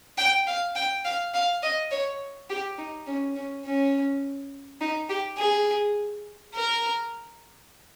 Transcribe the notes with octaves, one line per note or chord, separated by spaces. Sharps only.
G5
F5
G5
F5
F5
D#5
C#5
G4
D#4
C#4
C#4
C#4
D#4
G4
G#4
A#4